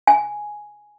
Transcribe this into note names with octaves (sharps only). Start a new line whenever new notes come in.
G#5